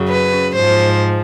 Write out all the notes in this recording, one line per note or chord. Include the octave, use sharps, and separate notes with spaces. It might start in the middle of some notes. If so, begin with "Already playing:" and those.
Already playing: F#2 C#3 F#3
B4
G#2 F3 C5